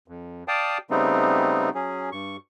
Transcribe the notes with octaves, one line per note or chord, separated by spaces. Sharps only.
F2
D5 F5 G5 A5 D#6
C#3 G3 A3 B3 C4 D#4
F#3 C#4 G#4
G2 C#6